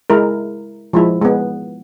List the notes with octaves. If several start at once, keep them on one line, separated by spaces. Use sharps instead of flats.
G#3 E4 A#4
F3 G#3 E4
G#3 B3